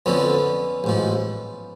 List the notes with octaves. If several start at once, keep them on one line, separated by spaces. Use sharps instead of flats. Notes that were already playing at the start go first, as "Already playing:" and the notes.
F2 D3 F3 B3 C#4
A1 G#2 F3